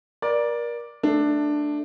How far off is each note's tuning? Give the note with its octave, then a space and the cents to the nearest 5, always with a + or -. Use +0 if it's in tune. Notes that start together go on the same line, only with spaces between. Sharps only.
A#4 +30 D5 +0
A3 +0 D4 +10